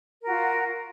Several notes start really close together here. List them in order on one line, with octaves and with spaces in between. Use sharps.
A#4 F#4 F4